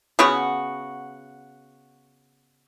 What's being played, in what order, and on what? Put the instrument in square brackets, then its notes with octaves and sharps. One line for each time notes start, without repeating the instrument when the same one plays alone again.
[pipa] C#3 B3 F#4